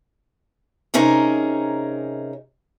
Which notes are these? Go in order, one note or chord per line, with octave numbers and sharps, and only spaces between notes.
C3 C#4 D#4 G#4 A#4